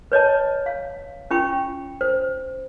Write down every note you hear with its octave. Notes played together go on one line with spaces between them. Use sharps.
B4 C#5 D#5 A5
F5
C#4 F4 G5 B5 C#6
C5